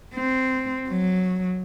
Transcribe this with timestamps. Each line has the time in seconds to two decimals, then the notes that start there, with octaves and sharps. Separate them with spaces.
0.15 C4
0.89 F#3